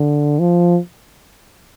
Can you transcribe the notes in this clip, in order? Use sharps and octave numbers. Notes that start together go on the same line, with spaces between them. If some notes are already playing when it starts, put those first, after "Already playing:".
Already playing: D3
F3